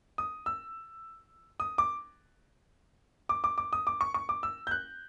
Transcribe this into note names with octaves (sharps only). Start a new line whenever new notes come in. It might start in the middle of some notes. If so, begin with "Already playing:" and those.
D#6
E6
D#6
D6
D6
D6
D6
D#6
D6
C#6
C#6
D6
E6
G6
F#6